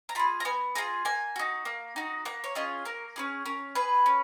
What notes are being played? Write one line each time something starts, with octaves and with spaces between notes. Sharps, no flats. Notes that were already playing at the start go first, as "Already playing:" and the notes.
A#5
F4 G#4 B5
A#5
B3 G#5
F4 G#4 A#5
A#3 G#5
D#4 F#4
A#3
D#4 F#4
A#3 F#5
C#5
C#4 F4 G#4 D#5
A#3 A#4
C#4 F4 G#4
C#4 A#4
G#4 B4
C#4